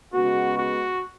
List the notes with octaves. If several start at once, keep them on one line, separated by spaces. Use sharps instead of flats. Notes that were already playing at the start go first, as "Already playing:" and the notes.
C#3 G#3 B3 F#4
F#4